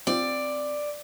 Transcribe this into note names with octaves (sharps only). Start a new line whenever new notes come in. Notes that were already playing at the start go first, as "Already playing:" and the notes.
C4 F4 D5